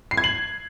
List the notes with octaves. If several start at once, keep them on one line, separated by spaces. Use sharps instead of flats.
C7
G#6
F#7